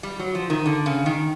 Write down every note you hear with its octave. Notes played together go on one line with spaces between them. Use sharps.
G3
F#3
F3
D#3
D3
C#3
D#3